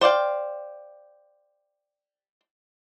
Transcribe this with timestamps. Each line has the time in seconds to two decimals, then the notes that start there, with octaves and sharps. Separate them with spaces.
0.01 C5 D5 F5 G5